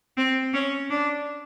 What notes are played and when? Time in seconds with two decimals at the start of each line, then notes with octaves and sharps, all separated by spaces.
0.17 C4
0.54 C#4
0.90 D4